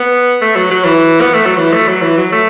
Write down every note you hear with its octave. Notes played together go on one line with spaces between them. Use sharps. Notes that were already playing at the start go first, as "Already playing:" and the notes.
Already playing: B3
A3
F#3
F#3
E3
B3
A3
F#3
E3
A3
F#3
E3
F#3
A3